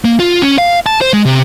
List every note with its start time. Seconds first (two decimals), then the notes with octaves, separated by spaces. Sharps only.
0.05 A#3
0.20 F4
0.42 C#4
0.58 F5
0.86 A5
1.01 C5
1.13 G#3
1.25 C3